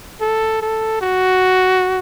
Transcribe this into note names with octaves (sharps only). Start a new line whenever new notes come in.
A4
A4
F#4